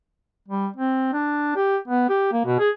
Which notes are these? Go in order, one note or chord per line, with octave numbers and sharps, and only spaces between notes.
G3
C4
D4
G4
B3
G4
A#3
B2
G#4